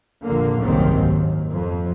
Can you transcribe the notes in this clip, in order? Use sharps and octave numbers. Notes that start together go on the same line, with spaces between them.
A#1 F2 D3 A#3
F#1 C2 G#2 D#3 F#3 C4
D#2
F2